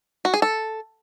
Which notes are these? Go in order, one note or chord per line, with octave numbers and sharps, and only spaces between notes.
F#4
G#4
A4